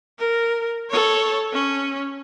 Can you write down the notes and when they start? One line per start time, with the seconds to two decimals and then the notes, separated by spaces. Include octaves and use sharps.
0.19 A#4
0.90 A4 C#5
1.53 C#4